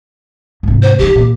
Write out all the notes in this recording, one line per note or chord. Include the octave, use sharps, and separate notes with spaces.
G#2 C3
C5
G2 D#3 G4
A#2